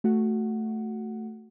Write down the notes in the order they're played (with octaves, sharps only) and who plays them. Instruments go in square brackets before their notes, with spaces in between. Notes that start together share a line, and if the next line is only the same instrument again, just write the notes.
[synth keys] A3 F#4 F#5